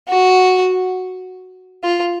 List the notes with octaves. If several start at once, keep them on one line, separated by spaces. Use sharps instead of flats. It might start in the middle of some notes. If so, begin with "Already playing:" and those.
F#4
F4